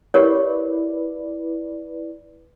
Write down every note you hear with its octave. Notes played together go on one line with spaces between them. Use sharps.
E4 G4 A#4 B4 C#5 D5